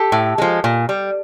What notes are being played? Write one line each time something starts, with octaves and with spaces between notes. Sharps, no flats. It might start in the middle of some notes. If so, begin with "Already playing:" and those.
Already playing: G4 A4
A2
F3 G#3
A#2
G3